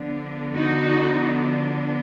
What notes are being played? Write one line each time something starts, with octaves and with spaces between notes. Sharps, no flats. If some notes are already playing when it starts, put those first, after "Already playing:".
Already playing: D3 F3 B3 D4
D#4 F#4